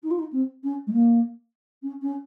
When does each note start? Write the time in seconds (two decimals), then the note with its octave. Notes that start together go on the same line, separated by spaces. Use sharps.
0.03 D#4
0.10 F4
0.18 D#4
0.32 C4
0.63 C#4
0.86 G#3
0.92 A#3
1.82 C#4
2.01 C#4